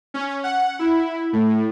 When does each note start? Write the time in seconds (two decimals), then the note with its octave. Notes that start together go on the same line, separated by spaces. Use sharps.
0.14 C#4
0.44 F#5
0.79 E4
1.33 A2